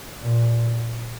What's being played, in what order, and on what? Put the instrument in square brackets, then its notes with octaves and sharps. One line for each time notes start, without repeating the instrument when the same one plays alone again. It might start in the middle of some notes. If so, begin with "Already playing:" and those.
[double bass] A#2